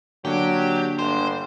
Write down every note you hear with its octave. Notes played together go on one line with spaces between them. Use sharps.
D3 F#3 A#3 D4 G4
G1 C5